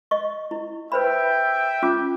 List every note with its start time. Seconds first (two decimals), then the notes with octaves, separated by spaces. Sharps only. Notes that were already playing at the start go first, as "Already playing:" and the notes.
0.11 D#5 C#6
0.51 E4
0.92 B4 C5 E5 G5 B5
1.83 C#4 F4 D6